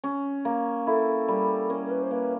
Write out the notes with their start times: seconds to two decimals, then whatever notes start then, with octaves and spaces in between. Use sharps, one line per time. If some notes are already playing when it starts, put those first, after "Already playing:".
0.04 C#4
0.45 A#3
0.87 E4 A4
1.28 G3
1.69 C#4 A#4
1.85 A#4
1.90 B4
2.02 C5
2.11 A#3 B4